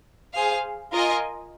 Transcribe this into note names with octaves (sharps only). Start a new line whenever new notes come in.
G#4 C5 F5
F4 A#4 D#5 G#5